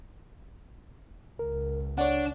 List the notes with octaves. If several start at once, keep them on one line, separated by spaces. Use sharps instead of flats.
C#2 A#4
D4 C#5 D5 F#5